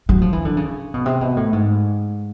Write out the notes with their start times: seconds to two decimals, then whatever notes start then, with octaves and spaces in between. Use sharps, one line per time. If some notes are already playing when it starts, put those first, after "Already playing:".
0.09 F#3
0.22 F3
0.33 E3
0.45 D3
0.57 C#3
0.94 B2
1.06 C3
1.21 B2
1.37 A2
1.53 G#2